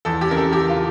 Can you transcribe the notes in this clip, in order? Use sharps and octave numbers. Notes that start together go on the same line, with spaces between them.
E2 A4
G4
C#3 A#4
A4
E2 G4
F4